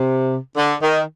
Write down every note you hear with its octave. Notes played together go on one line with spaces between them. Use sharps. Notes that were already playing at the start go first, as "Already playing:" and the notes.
Already playing: C3
D3
D#3